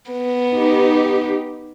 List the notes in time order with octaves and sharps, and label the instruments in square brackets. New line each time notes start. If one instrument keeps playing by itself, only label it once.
[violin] B3
[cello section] D#4 G4